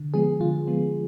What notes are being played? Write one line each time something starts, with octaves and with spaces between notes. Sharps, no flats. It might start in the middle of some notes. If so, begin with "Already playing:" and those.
Already playing: D3
F3 G#3 B3 G#4
D3 F4
F3 G#3 B3